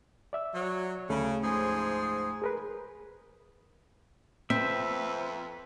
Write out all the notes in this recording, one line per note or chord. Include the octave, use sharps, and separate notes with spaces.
D5 E5 E6
F#3
D2 C#3 A3 B5
G#2 F3 G#4
G#4 A#4 B4
F2 C4 B4 E5